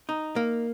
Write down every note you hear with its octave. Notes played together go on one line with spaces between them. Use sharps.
D#4
A#3